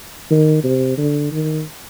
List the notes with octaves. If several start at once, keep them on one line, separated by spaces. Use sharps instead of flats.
D#3
C3
D3
D#3